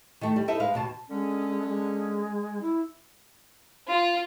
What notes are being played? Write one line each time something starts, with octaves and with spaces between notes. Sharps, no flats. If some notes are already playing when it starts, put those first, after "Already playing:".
D#3 A3
G3
D#4 E4 A4 E5
G#3 B4 F5
D#2 B2 A5
D3 G#3 C#4
G#3
E4
F4